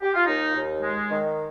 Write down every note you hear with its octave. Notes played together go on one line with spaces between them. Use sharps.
G4
F4
D#2 D#4
D#2
G#3
D#3